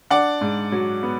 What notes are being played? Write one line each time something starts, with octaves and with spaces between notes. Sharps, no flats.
D4 D5 F#5
G#2
F#3
B3